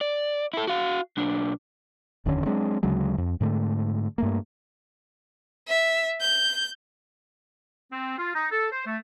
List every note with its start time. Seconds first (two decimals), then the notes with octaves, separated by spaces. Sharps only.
0.01 D5
0.53 E4 A4
0.67 F#4 F5
1.17 B1 D4
2.26 F1 D#2 D3 C#4
2.46 F#3 G#3 C4 D4
2.83 D2 C#3 F#3 G#3
3.18 F2
3.41 G#2 D3 A3
4.18 G2 A3 A#3
5.68 E5
6.21 G6
7.93 C4
8.18 F4
8.35 D#4
8.52 A4
8.72 C5
8.86 A3